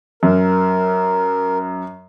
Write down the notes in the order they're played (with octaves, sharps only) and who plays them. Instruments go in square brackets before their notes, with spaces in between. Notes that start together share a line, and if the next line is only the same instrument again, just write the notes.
[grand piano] F#2 [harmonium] A#4